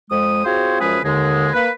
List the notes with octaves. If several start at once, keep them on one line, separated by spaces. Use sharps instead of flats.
F2 G#3 D#6
C4 F4 F#4 G#4 C5 C#5
F#2 F3 G#3 C#4 G#4 B4
D#2 D3 G#3
A#3 B4